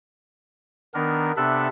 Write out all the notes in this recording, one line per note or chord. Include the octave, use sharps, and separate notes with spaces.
D#3 B3 D4 A#4
C3 B3 D4 A4 E5 F#6